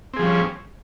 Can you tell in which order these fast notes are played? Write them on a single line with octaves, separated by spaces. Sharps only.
C4 G#4 F3 G3 C#4